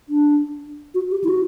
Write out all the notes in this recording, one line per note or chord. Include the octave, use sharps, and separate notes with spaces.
D4
F#4
G4
E4
F#4